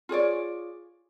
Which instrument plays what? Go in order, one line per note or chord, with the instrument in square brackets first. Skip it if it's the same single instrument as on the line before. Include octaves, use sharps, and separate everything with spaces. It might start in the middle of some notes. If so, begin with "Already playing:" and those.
[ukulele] F4 G#4 C#5 D5